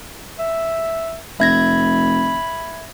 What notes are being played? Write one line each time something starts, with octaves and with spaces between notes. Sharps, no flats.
E5
F1 E5 B5 G#6 A#6